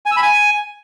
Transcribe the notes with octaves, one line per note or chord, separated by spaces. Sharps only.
G#5
E6
B5
G#5